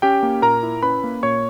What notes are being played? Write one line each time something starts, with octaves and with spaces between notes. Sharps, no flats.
C#4 G4 G5
A#3
A#2 A#4 A#5
E4
C#4 B4 B5
A#3
A#2 C#5 C#6